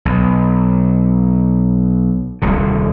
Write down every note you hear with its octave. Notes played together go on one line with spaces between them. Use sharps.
B1
D#1 C2 D3